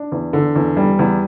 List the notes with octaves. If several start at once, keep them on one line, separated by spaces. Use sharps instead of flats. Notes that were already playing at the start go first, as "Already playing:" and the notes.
Already playing: D4
E2
D3
E2
G3
E2